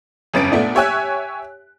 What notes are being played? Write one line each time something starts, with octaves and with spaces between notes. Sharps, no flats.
G1 F2 C#4 B4 A6 D7
A#2 A3 B3 D4
G4 C#5 E5 G#5 E6 F#6